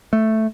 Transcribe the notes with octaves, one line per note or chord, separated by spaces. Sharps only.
A3